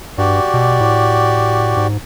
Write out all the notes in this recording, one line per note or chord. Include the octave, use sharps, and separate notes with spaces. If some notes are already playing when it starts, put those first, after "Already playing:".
G2 F#4 G4 D5
B2
A2
G#2